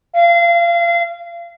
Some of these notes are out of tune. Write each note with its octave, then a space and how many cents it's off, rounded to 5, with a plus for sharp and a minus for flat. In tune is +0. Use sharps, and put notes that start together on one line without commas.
F5 -30